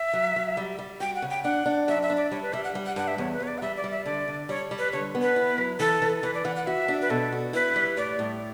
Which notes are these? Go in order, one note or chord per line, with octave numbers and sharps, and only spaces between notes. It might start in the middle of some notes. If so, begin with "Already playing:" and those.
Already playing: E5
F#3
F#3
G3
G3
F#4 G5
F#5
C#3
G5
D4 F#5
D4
F#2 E5
E5
D4
D5
G3 C#5
B4
G3 E5
F#5
G3
F#5
G2 F#5
E5
E2 C#5
B4
E2 C#5
D5
F#5
G3 E5
D5
G3
E5
D3 D5
D3
G3 C#5
G3
B4
D3 C#5
B3
B4
E4
F#3
E3 A4
E3
E3 B4
D5
E3 F#5
F#5
F#4 E5
D4
B4
B2 A4
F#4
E4 B4
G3
A2 D5
A2